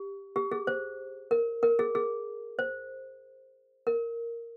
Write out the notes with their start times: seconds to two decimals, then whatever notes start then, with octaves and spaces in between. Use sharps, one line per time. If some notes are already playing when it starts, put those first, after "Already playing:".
Already playing: G4
0.36 G4
0.52 G#4
0.67 C5
1.31 A#4
1.63 A#4
1.79 G#4
1.95 G#4
2.59 C5
3.87 A#4